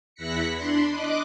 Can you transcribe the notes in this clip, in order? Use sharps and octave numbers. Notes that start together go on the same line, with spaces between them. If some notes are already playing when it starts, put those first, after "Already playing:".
E2 E4 F#6 A#6 B6 C#7
D4 B5 C6
D#5 D6 F#6